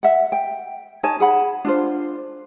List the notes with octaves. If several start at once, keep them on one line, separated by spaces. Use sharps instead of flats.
E5 F#5
G5
D#4 C#5 G#5 A5
G#4 F#5 B5
D4 F4 C5